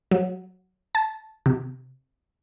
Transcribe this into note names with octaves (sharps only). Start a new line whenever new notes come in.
F#3
A5
C3